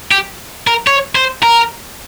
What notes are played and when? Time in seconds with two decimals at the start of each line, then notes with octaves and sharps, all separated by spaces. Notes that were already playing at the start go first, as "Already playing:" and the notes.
0.12 G4
0.67 A#4
0.87 C#5
1.15 C5
1.43 A#4